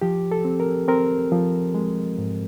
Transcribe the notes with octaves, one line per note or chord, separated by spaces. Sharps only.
F3 G4
A4
C4
A#4
C4 A#4
F3
G#3
G#2